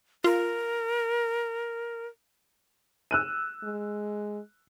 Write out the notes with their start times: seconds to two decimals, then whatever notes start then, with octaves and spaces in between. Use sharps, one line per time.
0.24 F4 A#4
3.11 E6 F#6 D#7
3.63 G#3